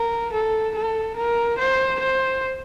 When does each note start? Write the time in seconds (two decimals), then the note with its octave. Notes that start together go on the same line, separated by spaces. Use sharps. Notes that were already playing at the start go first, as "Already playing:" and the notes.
Already playing: A#4
0.33 A4
0.75 A4
1.17 A#4
1.59 C5
2.00 C5